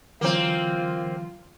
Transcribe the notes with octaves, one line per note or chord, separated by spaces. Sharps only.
D3 E3 F#3 A#3 C4 F4